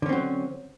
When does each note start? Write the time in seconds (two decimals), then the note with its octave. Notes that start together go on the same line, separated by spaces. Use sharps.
0.02 D3
0.06 C#4
0.09 C4
0.13 F#3